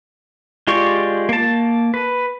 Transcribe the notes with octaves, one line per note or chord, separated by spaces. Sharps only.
G#3 F4 G4 D5 C#6
A#3 A5
B4